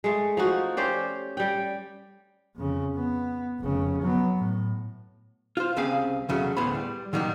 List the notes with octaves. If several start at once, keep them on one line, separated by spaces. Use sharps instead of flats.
G#3 A3
F3 D#4 F#4
C#4 G4 C5 D5
G3 G5
F2 C#3
B3
F1 C#3
F#3 B3
A2
F4 C5
C2 C#3 C4 G#4 F5
E2 C#3 F#3 A3
D2 A2 B3 G#4 C5 B5
G3
A#2 D#3 F#3 G3 A#3 D#4